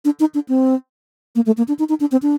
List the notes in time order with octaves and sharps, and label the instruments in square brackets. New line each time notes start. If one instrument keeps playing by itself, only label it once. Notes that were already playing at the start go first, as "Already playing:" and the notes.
[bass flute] D4
D#4
D4
C4
A#3
A3
A#3
D4
D#4
D#4
D4
C4
D4